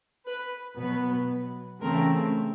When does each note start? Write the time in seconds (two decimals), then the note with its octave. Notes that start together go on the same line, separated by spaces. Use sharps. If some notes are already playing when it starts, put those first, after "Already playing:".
0.27 B4
0.78 B2 F#3 B3 B4
1.82 C#3 E3 A3 C4 A#4